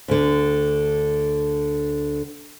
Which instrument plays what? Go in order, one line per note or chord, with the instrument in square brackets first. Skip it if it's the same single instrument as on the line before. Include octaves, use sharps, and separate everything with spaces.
[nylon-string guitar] D2 D3